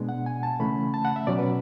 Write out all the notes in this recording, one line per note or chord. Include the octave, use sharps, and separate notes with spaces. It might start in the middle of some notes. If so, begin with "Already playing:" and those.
Already playing: B2 G#3 B3 D4
F#5
G#5
A5
C#3 E3 A3 C#4 B5
A5
F#5
E5
B2 F#3 C#4 D5
B4